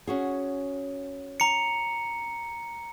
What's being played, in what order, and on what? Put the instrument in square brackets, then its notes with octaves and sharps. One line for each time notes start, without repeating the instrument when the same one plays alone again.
[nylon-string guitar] C#4 F#4 G#4
[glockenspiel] A#5 C#7